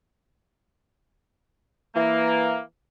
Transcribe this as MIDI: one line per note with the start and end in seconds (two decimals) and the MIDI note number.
1.95 2.60 52
1.95 2.60 58